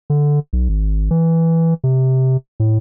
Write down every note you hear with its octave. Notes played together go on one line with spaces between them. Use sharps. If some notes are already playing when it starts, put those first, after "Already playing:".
D3
B1
G#1
E3
C3
A2